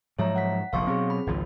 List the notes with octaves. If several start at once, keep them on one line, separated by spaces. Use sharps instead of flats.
G#2 F3 F#3 C#5 E5 A#5
F#5 B6
F1 A#1 F5 C6 C#6
B2 F#3 C4 G#4
B5
G#1 C#2 F3